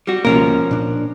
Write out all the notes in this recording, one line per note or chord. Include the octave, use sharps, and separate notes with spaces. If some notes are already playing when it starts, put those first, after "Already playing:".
G3 F#4
C#2 B2 F3 A#3 C#4 A#4
A#2 D4